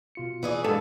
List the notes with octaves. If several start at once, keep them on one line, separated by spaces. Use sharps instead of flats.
B2 F4 C#7
E3 G#4 D5
G2 G#3 A4 B4 F5